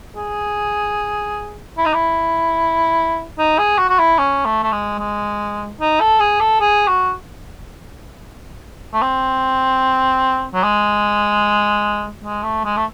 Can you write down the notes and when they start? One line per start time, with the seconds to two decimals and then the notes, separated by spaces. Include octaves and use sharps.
0.16 G#4
1.77 E4
1.85 D#4
1.94 E4
3.38 D#4
3.58 G#4
3.78 F#4
3.89 F#4
3.99 E4
4.18 C#4
4.45 A3
4.63 A3
4.72 G#3
4.99 G#3
5.80 D#4
6.00 A4
6.20 G#4
6.40 A4
6.60 G#4
6.88 F#4
8.93 A3
9.02 C4
10.54 F#3
10.63 G#3
12.24 G#3
12.43 A3
12.64 G#3
12.77 A3